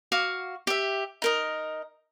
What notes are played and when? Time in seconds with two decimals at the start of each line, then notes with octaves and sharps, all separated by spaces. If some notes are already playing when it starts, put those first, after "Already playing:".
0.12 F#4 F5 D6
0.67 G4 E5
1.22 D#4 A#4 D#5